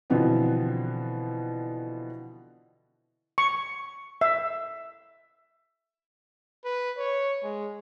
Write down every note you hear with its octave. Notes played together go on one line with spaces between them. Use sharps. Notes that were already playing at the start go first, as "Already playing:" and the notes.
B2 D3 E3 F3 B3 C4
C#6
E5
B4
C#5
G#3